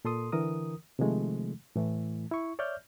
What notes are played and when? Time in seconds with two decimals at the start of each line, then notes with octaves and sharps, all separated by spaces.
0.05 A#2 A4 C6 D#6
0.32 D3 E3 A#4 D#6
0.99 C3 D#3 F3 G#3 A3
1.76 A2 E3 A3
2.31 E4 C#6
2.59 C#5 D5 E5 F6 G6